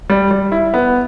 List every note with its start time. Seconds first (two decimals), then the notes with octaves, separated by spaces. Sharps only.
0.10 G3
0.31 G3
0.52 E4
0.74 B3